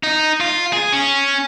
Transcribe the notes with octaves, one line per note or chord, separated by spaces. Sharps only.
D#4
F4
G#4
C#4